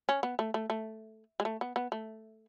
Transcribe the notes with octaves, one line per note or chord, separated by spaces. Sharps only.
C#4
B3
A3
A3
A3
G#3
A3
B3
B3
A3